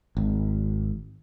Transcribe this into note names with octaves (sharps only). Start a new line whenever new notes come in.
G#1